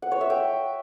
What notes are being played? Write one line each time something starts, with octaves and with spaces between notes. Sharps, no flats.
F#5
C#5
E5
G5